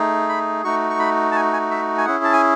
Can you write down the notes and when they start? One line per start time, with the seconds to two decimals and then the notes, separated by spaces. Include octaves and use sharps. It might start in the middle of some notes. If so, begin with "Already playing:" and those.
Already playing: A3 D#4 G#4
0.29 B5
0.64 A3 D#4 F#4 C#6
0.90 C#6
0.99 B5
1.32 A5
1.36 G#5
1.53 G#5
1.71 E5
1.98 G#5
2.05 C#4 E4 G#4 F#5
2.24 A5
2.33 G#5